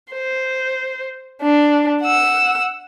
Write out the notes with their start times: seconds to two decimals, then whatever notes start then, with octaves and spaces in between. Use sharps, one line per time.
0.13 C5
1.41 D4
2.02 F#5 E6